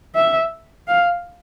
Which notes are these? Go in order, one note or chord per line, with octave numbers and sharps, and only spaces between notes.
E5
F5